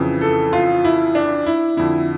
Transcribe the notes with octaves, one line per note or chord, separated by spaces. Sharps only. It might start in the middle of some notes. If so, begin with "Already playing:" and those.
Already playing: F2 C#3 E3
A4
F4
E4
D4
E4
F2 D3 E4